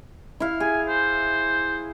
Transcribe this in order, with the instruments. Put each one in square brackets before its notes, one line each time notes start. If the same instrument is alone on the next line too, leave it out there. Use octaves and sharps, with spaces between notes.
[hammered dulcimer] E4 F5
[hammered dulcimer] G#4 [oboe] G#5
[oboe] C5